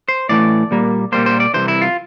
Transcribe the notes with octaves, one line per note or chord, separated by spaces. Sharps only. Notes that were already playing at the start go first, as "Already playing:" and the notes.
C5
A2 E3 A3 D5
A#2 G3 A#3
A#2 G3 A#3 C5
C5
D5
C2 C3 E3 C5
E4
F4